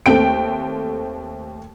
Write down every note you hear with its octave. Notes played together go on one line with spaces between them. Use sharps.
D#2 A3 C4 G5 D7